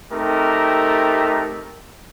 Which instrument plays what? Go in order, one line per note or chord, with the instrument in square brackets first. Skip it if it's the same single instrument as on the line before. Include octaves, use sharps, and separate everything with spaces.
[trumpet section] A3 C4 D#4 G4 A#4